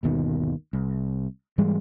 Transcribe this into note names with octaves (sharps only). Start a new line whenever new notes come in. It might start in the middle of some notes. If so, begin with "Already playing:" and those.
G1 D#2 B2 D#3
C2
G#2 E3 G3 G#3